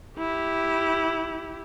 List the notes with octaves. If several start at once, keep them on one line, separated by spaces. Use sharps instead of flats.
E4 G4